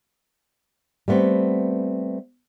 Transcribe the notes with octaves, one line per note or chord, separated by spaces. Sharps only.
G3 A3 B3 C4